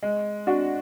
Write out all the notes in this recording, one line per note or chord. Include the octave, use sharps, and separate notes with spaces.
G#3
D4 F#4